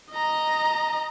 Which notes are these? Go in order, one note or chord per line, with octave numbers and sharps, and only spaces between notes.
D#5 A#5